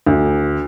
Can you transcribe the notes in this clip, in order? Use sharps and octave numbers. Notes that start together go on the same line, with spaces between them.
D2